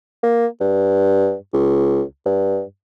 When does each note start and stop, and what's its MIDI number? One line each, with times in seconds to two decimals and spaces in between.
0.23 0.47 58
0.61 1.34 43
1.53 2.02 37
2.26 2.62 43